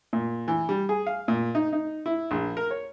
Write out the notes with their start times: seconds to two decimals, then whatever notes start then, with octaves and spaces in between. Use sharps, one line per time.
0.13 A#2
0.48 E3
0.69 G3
0.89 G#4
1.07 F5
1.28 A#2
1.55 D#4
1.73 D#4
2.06 E4
2.31 A#1
2.57 A#4
2.71 C#5